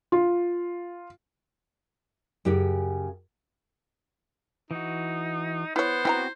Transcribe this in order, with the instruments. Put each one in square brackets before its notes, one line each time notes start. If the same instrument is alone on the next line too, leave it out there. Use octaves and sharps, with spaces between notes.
[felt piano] F4
[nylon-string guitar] F#2 C#3 G4
[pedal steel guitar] E3 F#4 [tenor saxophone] D#4
[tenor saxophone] B3 [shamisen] E4 C#5 [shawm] C5
[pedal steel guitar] C4 F#4 C#5 [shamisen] E4 G5 A#5